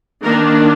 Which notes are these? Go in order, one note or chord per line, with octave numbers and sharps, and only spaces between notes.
D#3 A#3 D4 A#4